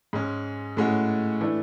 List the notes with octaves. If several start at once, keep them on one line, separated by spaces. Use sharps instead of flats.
G#2 G#3 C#4
A2 G#3 C#4 F#4
E3 A3 D4